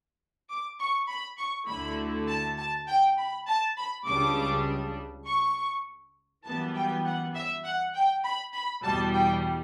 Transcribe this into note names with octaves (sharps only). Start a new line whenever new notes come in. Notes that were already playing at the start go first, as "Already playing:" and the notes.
D6
C#6
B5
C#6
D2 D3 A3 E4 B5
A5
A5
G5
B5
A5
B5
C#2 C#3 G3 D4 D6
C#6
F#2 E3 G3 B3 A5
G5
F#5
E5
F#5
G5
B5
B5
E2 B2 G3 A5
G5